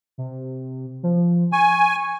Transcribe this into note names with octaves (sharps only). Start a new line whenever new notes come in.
C3
F3
G#5 C#6